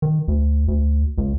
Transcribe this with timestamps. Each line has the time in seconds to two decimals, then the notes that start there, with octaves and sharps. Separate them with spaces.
0.02 D#3
0.28 D2
0.68 D2
1.18 C#2